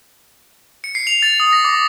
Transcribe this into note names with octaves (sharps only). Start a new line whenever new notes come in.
C#7
C7
F7
A6
D#6
A#6
D6